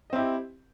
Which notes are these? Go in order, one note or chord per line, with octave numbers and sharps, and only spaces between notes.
C4 E4 G4 D#5